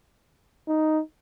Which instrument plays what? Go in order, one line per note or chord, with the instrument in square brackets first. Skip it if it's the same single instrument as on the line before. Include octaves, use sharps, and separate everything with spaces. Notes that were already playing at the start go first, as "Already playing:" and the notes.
[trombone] D#4